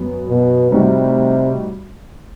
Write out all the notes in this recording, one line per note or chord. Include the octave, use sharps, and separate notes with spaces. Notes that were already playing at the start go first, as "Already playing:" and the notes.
Already playing: F#2 F#3 B3
B2
A2 C3 G3 D#4 F#4